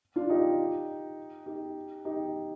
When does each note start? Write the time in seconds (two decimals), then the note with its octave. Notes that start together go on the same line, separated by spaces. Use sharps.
0.16 D4 F4
0.30 D#4 G4
1.46 D#4 G4
2.05 D#4 G4